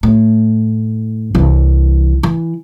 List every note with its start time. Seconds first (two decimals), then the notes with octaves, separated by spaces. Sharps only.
0.03 A2
1.35 C2 E3
2.23 E3